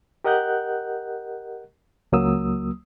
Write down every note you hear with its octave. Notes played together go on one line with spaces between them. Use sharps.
G4 A#4 D#5 F#5 F#6 G6
C#2 F#3 A#3 D#6 E6